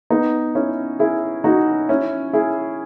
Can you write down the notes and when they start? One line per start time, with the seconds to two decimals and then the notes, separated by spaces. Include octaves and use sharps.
0.10 B3 D#4
0.55 C#4 E4
0.99 E4 G#4
1.44 D#4 F#4
1.89 C#4 E4
2.33 E4 G#4